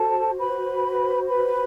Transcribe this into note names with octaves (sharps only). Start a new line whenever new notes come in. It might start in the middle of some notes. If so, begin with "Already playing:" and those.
Already playing: F#4 A4 C5 A5
B4 B5
B4 B5